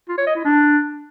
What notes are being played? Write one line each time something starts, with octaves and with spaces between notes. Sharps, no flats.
F4
C#5
D#5
E4
D4